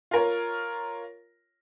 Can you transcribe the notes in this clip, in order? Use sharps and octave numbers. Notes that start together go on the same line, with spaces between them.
F4 A#4 C#5